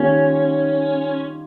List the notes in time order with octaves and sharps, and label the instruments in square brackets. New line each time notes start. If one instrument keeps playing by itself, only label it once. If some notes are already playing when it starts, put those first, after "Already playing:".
Already playing: [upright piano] D#3 G3 A#3 F4 [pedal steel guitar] C#4